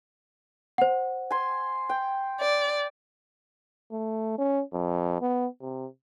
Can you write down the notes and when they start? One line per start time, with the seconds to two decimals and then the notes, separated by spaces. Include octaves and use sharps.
0.78 C5 F#5
1.31 G#5 C6
1.89 G5
2.41 D5
3.92 A3
4.38 C#4
4.73 F2
5.21 B3
5.61 C3